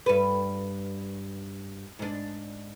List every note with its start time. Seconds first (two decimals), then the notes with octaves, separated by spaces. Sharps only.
0.06 G2 B4
1.99 G#2 D4